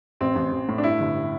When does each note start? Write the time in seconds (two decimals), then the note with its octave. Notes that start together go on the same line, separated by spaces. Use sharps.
0.21 A1 C4
0.35 A1
0.52 A1
0.69 A2
0.78 D4
0.84 G2 E4
1.00 G1